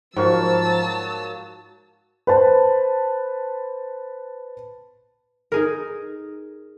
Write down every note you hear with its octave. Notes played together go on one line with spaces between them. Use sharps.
G#2 F3 F#3 A#3 A5 C#6 E6
B4 C5 A5
D#4 G#4 A#4